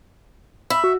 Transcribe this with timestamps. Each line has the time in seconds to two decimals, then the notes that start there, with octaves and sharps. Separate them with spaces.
0.70 E5 B5
0.84 F#4